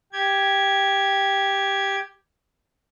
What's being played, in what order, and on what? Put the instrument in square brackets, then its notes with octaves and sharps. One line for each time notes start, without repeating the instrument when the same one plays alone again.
[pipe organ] G4 G#6